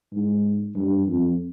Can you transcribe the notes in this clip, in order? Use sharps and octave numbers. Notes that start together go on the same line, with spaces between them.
G#2
G2
F2